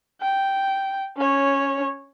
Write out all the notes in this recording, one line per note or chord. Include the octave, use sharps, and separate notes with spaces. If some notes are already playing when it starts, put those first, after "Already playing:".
G5
C#4 C#5